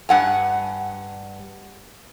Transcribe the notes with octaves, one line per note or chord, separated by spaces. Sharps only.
G2 F#5 G#5